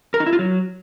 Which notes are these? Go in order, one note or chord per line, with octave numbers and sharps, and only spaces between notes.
A#4
D#4
E4
F4
F#3